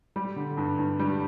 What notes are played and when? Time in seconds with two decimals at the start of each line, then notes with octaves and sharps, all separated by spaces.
0.16 G3
0.36 D3
0.57 G2
0.79 G2
1.00 G3